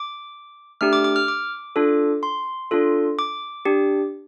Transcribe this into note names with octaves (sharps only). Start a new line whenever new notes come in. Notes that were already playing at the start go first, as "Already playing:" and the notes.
Already playing: D6
A3 D4 G4 F6
D6
D6
F6
D6
D4 F4 A4
C6
D4 F4 A4
D6
D4 G4